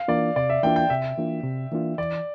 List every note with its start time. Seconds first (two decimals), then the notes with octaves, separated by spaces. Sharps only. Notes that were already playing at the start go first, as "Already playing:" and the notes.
Already playing: F5
0.08 E3 A#3 D4 F4 D5
0.36 C3 D5
0.50 E5
0.63 E3 A#3 D4 F4 G5
0.76 G5
0.90 C3 E5
1.18 E3 A#3 D4 F4
1.44 C3
1.72 E3 A#3 D4 F4
1.98 E3 D5